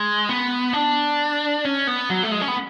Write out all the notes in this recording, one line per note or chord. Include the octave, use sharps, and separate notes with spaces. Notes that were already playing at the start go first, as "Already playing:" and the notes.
Already playing: G#3
B3
D4
C#4
B3
F#3
A3
G#3
C#4
B3